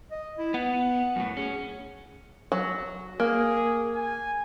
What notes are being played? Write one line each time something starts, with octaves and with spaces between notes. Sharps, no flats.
D#5
E4
B3 F#5
F#2 A2
C#4 G#4
F#3
A#3 G#4
G#5